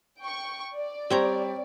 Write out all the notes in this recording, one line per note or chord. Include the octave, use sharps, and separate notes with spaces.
G5 C#6
D5
G3 C4 C#5 A#5